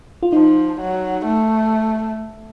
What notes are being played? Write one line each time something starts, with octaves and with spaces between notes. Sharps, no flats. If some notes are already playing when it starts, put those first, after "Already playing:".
F4
F3 D#4
F#3
A3